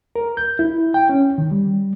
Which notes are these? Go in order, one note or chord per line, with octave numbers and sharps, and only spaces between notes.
A#4
G6
E4
G5
C#4
D#3
G3